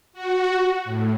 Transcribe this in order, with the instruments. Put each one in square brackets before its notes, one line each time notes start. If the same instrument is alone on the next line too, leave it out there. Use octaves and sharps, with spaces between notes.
[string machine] F#4
A2